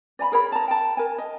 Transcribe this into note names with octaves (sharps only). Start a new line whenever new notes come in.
D5 G#5 A#5 B5
G#4 A#4 C#5 B5
A5 A#5
G5 A5
A#4 G#5
D#5